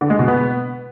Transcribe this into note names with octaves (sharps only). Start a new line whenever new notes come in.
D3
G#3
B2
B3